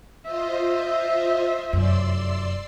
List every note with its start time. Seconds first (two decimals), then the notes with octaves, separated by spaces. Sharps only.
0.25 F4 C5 D#5 E5
1.73 F1 F#2 D5 C6 E6